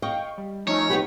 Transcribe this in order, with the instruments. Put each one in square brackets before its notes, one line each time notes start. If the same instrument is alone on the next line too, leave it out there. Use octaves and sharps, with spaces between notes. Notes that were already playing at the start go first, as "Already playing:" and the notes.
[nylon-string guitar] D#5 [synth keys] F5 G5 C#6
[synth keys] G3
[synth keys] F3 [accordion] A3 C#4 D#4 [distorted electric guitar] C#5
[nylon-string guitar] B3 D#4 G4 [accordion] B5